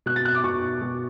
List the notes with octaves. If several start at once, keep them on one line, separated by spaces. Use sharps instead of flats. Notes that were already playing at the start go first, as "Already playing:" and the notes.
B2 F#6
A6
F#6
D6
B2 C#6
B2